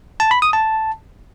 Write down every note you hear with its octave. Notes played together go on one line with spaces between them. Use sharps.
A5
B5
D#6
A5